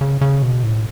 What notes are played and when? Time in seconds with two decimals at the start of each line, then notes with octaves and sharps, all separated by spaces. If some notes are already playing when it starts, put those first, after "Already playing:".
0.01 C#3
0.21 C#3
0.42 B2
0.63 A2